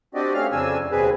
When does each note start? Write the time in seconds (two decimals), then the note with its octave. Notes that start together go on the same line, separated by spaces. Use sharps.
0.15 C4 D4 F#4 G4 D5 D#5
0.34 A3 C4 C#4 F5 F6
0.52 F2 C#3 C4 D4 G#5 E6
0.92 D#2 B2 C4 G#4 B4